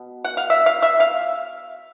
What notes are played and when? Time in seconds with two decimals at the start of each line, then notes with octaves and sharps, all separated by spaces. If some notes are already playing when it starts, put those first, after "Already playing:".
Already playing: B2
0.24 F#5
0.37 F5
0.50 E5
0.66 F5
0.82 E5
1.00 F5